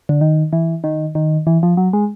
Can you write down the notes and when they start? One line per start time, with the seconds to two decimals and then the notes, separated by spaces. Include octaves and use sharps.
0.09 D3
0.21 D#3
0.53 E3
0.84 D#3
1.15 D#3
1.47 E3
1.63 F3
1.77 F#3
1.93 G#3